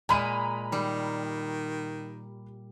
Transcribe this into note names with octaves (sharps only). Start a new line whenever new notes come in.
A#2 G#3 A#5 B5 D#7
D#3 G3